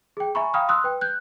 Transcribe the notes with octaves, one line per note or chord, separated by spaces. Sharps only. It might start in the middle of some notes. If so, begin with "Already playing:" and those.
G#4 G5
E5 G#5 A#5 B5 C#6
F5 G5 A#5 B5 D#6 F6
C6 D#6 E6 F#6
B4 G5
F#6 G6